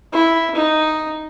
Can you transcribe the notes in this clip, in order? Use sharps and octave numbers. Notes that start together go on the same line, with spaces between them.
E4
D#4